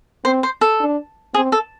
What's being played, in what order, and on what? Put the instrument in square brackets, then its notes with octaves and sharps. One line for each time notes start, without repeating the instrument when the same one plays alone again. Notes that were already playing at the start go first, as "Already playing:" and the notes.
[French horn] C4 [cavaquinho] C5
[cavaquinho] C5
A4
[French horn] D4
[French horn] C4 [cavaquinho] G#4
[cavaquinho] A4